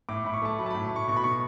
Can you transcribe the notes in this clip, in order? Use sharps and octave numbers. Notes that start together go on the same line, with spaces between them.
A2 D6
A2 B5
C#6
A3 A5
F#3 B5
A5
A2 B5
A2 C#6
B2 C#6
B5
B2 C#6